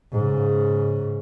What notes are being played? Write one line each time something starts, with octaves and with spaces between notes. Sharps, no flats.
G#2 C#3